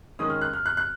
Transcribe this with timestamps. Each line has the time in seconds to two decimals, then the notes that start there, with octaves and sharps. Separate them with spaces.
0.19 D#3 G#3 C#4 D#6
0.30 F6
0.41 F#6
0.53 F6
0.66 F#6
0.77 F#6